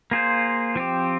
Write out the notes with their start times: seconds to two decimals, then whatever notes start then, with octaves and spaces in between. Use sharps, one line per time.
0.11 A#3 F4 G#4 C5
0.76 F3 C4 G4